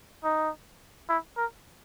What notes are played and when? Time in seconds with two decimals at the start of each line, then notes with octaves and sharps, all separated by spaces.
0.24 D#4
1.09 E4
1.37 A#4